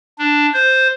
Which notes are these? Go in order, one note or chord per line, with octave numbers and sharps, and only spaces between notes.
D4
C5